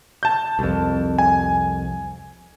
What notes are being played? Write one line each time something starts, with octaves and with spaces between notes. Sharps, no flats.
A5 G6
C2 F2
G#5